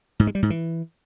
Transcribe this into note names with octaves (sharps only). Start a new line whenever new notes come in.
G#2
G#3
G3
G#2
E3